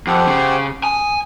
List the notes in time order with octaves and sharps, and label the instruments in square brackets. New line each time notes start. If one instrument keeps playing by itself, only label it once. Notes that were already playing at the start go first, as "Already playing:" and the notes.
[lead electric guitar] F2 [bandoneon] G4 C5 F#5
[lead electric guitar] C#3
[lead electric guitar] G#5 [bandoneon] D#6